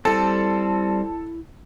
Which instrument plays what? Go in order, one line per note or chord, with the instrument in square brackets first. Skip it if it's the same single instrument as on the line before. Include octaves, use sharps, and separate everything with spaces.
[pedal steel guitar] G3 C4 [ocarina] E4 [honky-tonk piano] A4